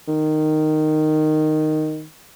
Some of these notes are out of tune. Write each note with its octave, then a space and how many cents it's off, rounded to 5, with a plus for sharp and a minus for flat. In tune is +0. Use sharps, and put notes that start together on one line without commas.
D#3 -10